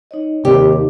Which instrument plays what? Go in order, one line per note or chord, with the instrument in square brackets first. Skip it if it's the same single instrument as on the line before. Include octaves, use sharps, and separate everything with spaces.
[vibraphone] D#4 C#5 D#5
[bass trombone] D#2 [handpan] C3 D5 [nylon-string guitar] G4